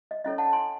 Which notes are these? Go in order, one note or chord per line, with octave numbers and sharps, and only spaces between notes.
D#5
C#4 E4 A4 C#5 D#5
F#5 A5
G#5 C6